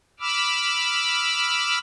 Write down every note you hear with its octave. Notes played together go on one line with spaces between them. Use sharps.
B5 D6 E6 F6